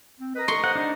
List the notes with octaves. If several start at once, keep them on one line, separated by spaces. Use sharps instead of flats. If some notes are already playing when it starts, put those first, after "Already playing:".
C4
A#4 B4 D#5 D#6
C6 C#6
C5 F#5
D4 D#4